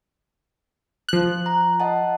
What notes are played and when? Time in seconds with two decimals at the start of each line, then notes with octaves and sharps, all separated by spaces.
1.09 F3 F#6
1.46 A#5
1.80 D#5 F#5 A5